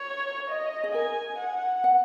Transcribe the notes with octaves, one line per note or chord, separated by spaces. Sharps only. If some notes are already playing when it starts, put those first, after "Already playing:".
Already playing: C#5
D#5
G#4
A#4 G#5
F#5
F#5